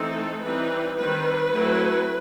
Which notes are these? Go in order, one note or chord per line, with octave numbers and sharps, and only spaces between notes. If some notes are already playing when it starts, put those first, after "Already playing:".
Already playing: E3 A3 C4 D#4 A4
E3 G3 C4 D#4 B4
D#3 G3 C4 B4
F#3 A3 C4 E4